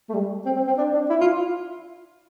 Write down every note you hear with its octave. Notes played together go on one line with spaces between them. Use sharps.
A3
G3
C4
C4
C4
D4
D4
E4
F4